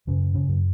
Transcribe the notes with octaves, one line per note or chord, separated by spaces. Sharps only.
F#2 C#3 C#4
C#3 C#4
F#2